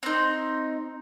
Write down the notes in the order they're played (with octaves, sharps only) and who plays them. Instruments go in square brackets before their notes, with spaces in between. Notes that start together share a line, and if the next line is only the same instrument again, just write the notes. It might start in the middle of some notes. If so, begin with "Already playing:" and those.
[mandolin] C4 D#4